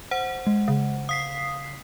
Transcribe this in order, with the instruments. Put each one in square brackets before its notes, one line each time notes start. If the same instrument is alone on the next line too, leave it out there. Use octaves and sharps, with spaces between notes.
[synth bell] C5 F#5
[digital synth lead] G#3
[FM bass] C#3
[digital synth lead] F5 [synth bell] D#6 B6 C7